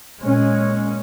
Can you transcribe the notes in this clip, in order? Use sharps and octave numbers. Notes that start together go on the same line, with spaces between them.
A#2 G#3 C#4